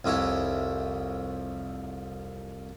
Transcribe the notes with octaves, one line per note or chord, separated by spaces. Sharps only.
C2 F2 E4 C#5